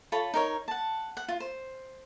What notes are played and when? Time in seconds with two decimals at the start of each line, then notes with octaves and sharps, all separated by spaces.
0.12 F4 A4 C#5 B5
0.34 D#4 A#4 C#5
0.68 F#5 A5
1.17 F#5
1.28 F4
1.40 C5